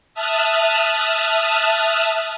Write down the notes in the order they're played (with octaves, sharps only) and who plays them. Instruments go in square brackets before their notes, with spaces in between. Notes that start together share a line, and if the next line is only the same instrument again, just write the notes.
[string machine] E5 A5 D#6 F6 F#6